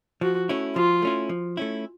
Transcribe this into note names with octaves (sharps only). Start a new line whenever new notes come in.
F3 F#4
A3 C#4 E4
F3 F4
A3 C#4 E4
F3
A3 C#4 E4